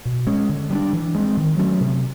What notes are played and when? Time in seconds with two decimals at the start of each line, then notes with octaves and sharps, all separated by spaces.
0.05 B2
0.27 G#3 C#4
0.49 D3
0.70 G3 B3
0.75 D4
0.93 E3
1.15 G#3 C4
1.37 D#3
1.59 F#3 A3 C#4
1.80 C3